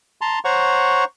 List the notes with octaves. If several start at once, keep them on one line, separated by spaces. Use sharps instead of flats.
A5 A#5 C6
C5 C#5 F#5 A#5 C#6